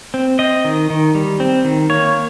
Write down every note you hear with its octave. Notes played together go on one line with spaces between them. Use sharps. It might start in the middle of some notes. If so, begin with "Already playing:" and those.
C4
C4 D#5
D#3
D#3
G3
C4
D#3
A#3 C#5